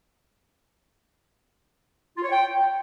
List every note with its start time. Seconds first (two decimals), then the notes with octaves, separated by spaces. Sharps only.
2.16 F4
2.23 C#5
2.30 G5